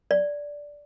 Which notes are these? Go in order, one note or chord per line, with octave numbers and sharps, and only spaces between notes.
D5